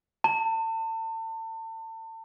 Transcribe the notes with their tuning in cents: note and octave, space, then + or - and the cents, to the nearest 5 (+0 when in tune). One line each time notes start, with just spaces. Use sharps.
A5 +35